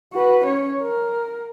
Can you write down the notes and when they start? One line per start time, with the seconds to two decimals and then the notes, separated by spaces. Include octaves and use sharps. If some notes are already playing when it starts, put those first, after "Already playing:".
0.13 F#4 B4
0.45 C#4 C#5
0.82 A#4